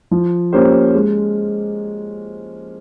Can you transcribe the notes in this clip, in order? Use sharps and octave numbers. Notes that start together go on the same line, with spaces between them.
F3
A#3 C#4 G4 C5
G#3